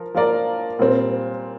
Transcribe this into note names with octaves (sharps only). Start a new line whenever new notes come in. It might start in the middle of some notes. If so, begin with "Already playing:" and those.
Already playing: F3 A#4
F3 A#3 F4 A#4 D5
A#2 G3 C4